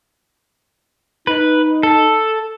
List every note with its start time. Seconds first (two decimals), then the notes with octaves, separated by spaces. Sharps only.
1.27 D#4 B4
1.83 A4